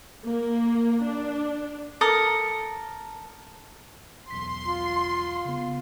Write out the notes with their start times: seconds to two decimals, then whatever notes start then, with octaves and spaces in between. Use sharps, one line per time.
0.25 A#3
1.05 D4
2.01 A4 A#4 D#6
4.31 B1 E2 C6 B6
4.65 F4
5.45 C#3 B3